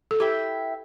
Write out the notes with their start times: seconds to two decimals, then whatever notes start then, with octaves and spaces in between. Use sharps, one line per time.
0.11 A4
0.20 E4 G4 B4 E5 G5